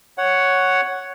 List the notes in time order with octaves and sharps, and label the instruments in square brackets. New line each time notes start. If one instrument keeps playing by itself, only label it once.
[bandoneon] C#5 F#5